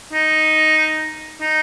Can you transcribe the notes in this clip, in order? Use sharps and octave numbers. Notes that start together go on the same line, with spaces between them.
D#4
D#4